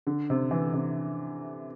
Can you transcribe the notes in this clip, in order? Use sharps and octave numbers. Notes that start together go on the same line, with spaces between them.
D3
C3
E3
C3